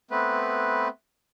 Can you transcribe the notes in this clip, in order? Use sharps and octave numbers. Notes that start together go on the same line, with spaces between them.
A3 B3 C4 B4